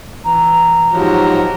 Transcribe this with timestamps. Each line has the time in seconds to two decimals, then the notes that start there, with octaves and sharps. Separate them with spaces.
0.24 E3 A#5
0.92 G#2 F3 F#3 F#4 G4 A#4